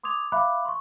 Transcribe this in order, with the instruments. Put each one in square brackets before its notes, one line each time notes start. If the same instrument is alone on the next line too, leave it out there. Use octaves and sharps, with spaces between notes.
[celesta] C6 D6 D#6 G#6 F7
E5 F5 B5 D6 F#6
C6 C#6